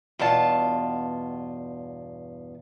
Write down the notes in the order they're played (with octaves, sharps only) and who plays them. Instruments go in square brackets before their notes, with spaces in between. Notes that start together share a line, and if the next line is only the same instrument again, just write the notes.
[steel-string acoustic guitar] E2 G2 B2 F4 A5